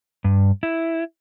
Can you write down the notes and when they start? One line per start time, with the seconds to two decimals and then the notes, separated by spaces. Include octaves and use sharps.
0.24 G2
0.63 E4